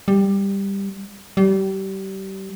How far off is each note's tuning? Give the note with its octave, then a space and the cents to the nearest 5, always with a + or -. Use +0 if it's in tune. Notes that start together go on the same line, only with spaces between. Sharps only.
G3 +10
G3 -30